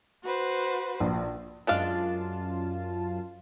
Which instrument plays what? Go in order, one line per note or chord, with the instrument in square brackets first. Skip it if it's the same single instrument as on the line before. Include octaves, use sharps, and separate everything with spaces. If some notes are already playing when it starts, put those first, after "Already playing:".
[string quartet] F#4 B4 C5
[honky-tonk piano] A#1
[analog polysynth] F#2 F4 A5 [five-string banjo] G#3 D4 F5